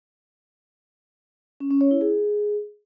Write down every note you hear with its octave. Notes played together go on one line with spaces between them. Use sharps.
C#4
C#4
C#5
E4
G#4